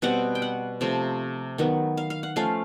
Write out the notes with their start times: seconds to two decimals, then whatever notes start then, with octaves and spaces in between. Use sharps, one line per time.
0.02 B2 G3 C4 F#5
0.35 G5
0.42 F#5
0.81 C3 F3 A3
1.58 D#3 F#3 B3
1.97 F5
2.10 F5
2.23 F#5
2.36 F3 A3 C#4 F5